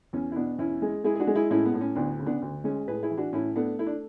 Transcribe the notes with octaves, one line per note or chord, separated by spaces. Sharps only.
E2 C#4
E4
B2 B3 D4
E2 C#4 E4
G#3
G#3 E4 G#4
G#4
D4 F#4
G#3
E4 G#4
A2 C#4 E4
B3
A2
C#4
D2 B3 D4
C#3
B3 D4
D2
G#3 C#4
A2 G#4 B4
E4 G#4
E3
D4 F#4
A2 C#4 E4
A3 B3 D4
A3 E4
D4